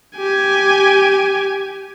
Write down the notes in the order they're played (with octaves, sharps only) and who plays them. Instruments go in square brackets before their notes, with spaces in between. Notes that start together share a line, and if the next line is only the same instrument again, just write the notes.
[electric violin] G4 G#5